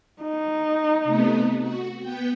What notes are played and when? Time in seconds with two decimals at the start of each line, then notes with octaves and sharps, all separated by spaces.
0.22 D#4
1.04 C3 A3 B3
1.61 F#4
2.00 B3 G5